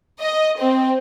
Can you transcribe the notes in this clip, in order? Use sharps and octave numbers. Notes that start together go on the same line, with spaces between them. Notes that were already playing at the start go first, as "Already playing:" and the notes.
D#5
C4